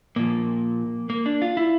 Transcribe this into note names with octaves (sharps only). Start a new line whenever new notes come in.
A#2 F3 A#3
A#3
D4
F4
E4